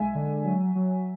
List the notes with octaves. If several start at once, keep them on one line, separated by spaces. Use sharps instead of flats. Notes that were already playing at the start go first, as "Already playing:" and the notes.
Already playing: B1 G#3 E5 G#5
D3
F#3
F#3